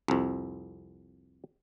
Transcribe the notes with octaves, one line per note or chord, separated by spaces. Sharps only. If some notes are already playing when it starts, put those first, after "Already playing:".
C2 F2